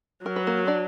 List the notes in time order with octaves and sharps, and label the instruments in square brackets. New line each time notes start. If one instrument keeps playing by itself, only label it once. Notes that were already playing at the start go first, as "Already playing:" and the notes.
[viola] F#3 [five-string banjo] A#4
[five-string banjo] B4
A#3 A#4
D4 D5